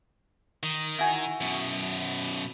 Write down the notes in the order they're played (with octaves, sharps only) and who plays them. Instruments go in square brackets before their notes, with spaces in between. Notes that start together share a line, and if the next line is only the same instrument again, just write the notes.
[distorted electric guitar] D#3
[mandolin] E4 F#4 G#5
[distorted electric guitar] F#2 B2